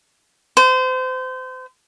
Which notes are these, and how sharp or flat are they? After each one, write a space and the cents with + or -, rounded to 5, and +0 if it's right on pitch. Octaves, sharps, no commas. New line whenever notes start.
C5 -30